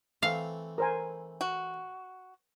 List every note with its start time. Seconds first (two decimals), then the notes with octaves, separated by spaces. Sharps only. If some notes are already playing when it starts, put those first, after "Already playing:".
0.23 E3 A3 C4 F5
0.78 A#4 C5 G#5
1.41 F#4